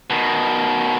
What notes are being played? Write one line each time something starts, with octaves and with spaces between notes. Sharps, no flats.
B2 D#3